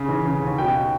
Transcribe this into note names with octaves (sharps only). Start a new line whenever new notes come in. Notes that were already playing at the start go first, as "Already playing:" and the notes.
Already playing: C#3
E3
C#3
D#2
B2 G5